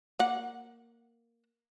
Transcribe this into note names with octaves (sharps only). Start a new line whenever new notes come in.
A#3 F#5